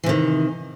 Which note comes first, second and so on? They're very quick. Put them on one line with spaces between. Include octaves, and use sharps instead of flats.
E3 C3 D#3